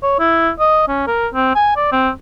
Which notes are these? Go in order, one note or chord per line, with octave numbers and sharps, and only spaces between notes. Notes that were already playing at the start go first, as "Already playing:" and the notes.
C#5
E4
D#5
C#4
A#4
C4
G#5
D5
C4